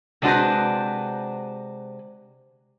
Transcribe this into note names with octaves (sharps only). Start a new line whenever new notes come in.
C3 G#3 D4 F#4 B4 C5